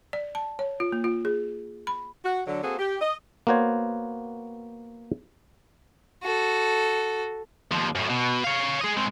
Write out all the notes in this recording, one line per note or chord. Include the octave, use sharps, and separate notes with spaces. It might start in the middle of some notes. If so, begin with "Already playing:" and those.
D5
A5
C#5
F4
A#3
F4
G#4
B5
F#4
D3 F#3
A#3 C4 F#4 G#4 A4 C5
G4
D#5
A#3 B3 F#4 C5 C#5
F#4 A4
D#2 F3
F#2 A2
B2
C#5 F5
G#4 D#5
G#3 C4